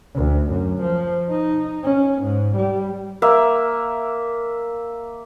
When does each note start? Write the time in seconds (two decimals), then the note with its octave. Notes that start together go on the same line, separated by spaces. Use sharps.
0.15 D2
0.51 F#2
0.82 F3
1.30 D#4
1.84 C#4
2.23 G#2
2.56 G3
3.22 A#3 E5